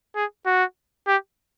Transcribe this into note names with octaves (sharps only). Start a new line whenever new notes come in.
G#4
F#4
G4